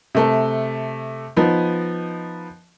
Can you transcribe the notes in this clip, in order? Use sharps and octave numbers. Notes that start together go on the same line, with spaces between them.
C3 A3
F3 B3 D#4